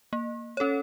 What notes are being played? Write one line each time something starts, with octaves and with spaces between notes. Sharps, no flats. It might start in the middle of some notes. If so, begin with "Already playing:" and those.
A#3
C#4 A4 C#5